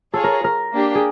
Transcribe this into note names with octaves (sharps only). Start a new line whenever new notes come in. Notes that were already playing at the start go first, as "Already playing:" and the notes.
F4 G#4 A4 C#5
A#4
A#4
A#3 D4 G4
G#4